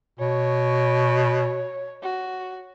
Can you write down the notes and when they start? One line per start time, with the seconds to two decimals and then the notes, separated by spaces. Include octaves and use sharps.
0.19 B2 C#5
2.02 F#4